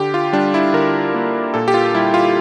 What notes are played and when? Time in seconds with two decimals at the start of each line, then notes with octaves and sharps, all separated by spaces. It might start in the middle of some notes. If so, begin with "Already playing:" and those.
Already playing: D3 G4
0.14 F4
0.33 G3 D4
0.54 E4
0.73 D3 A#4
1.14 A#3
1.54 A#2 A4
1.68 G4
1.74 F4
1.94 G3 E4
2.14 F4